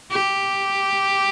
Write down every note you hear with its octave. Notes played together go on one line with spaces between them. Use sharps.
G4